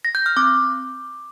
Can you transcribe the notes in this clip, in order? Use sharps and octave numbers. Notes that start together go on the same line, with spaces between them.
A#6
G6
F6
C4 D6